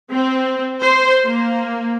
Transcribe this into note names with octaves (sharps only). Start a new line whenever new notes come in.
C4
C5
A#3